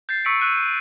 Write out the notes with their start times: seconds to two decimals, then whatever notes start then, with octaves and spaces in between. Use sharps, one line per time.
0.09 G6 A6 C7
0.25 C#6 E6 B6 C#7 D7
0.40 E6 F#6 D#7
0.61 D#7